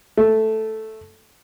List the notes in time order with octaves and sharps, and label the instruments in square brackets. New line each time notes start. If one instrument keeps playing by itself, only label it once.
[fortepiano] A3